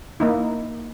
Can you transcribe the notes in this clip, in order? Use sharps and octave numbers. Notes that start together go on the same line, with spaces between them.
A#3 D#4 E4